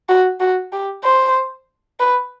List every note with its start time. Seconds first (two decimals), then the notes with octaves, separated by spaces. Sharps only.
0.09 F#4
0.40 F#4
0.72 G4
1.04 C5
1.99 B4